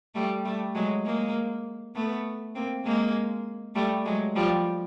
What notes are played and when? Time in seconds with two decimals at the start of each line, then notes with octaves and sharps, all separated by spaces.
0.15 G3 A3
0.45 G3 A3
0.75 F#3 G#3
1.05 G#3 A#3
1.95 A3 B3
2.55 A#3 C4
2.85 G#3 A#3
3.75 G3 A3
4.05 F#3 G#3
4.36 F3 G3